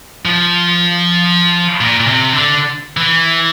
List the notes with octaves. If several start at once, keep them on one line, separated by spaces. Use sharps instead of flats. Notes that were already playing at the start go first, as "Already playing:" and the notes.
F3
A#2
A#2
C3
D3
E3